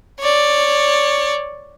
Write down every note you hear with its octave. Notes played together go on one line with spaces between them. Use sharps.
C#5 D5